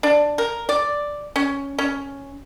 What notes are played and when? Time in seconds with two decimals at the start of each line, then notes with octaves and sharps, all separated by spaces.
0.03 D4
0.38 A#4
0.69 D5
1.36 C#4
1.78 C#4